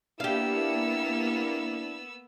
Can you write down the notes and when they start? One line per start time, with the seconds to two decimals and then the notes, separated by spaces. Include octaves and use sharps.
0.20 A#3 B3 D4 E4 G4 F5 E6